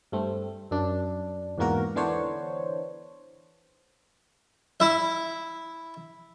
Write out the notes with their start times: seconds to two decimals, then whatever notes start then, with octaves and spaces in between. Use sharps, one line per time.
0.12 G2 A3 C4
0.71 F#2 D4
1.58 E2 G#2 B2 A#3 F#4 A#4
1.95 D3 E3 B3 D4 C5 C#5
4.80 E4 E5